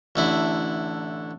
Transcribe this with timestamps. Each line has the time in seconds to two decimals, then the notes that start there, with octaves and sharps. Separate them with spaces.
0.16 A1 D3 E4